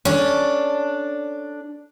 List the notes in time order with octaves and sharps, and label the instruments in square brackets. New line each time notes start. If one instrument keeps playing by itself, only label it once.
[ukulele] C#4 [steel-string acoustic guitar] D4 A4